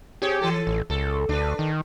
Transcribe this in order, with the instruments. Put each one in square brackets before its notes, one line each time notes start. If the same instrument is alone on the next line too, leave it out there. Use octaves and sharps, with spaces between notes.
[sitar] C4 G#4 C#5 [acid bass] G4
[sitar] E3 A4
[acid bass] A1
[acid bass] C#2 [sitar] A4
[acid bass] D2 [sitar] D4 B4
[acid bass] D#3